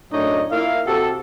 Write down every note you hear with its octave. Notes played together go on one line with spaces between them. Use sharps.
F#2 A2 D4 D#4 C#5 D#5
A#3 E4 F4 A#4 E5 F5
C3 F#4 G4 A4